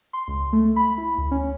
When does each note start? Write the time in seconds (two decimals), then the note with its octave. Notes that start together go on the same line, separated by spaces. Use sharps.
0.13 C6
0.28 C#2
0.53 A3
0.76 B5
0.98 E4
1.18 D2
1.31 C#4